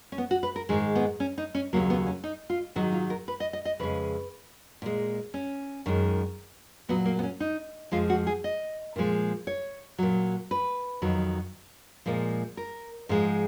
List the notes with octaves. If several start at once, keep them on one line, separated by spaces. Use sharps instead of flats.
C#4
B3
F#4
B4
A#4
G#2 D#3 G#3 G#4
B3
C#4
D#4
C#4
D#2 C#3 F#3 A#3
B3
C#4
D#4
F4
G#2 D#3 F#3 F#4
F4
A#4
B4
D#5
D#5
D#5
F2 C#3 G#3 B4
A#2 G#3
C#4
F#2 D#3 G#3
A#2 F#3 B3
A#3
B3
C#4
D#4
F2 F3 G#3 F4
F#4
G#4
D#5
A#2 F3 G#3
C#5
A#2 F#3
B4
F2 D#3 F#3
A#2 F3 G#3
A#4
G#2 F3 G#3